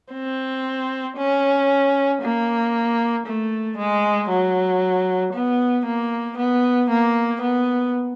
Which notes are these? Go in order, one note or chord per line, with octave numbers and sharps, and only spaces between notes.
C4
C#4
A#3
A3
G#3
F#3
B3
A#3
B3
A#3
B3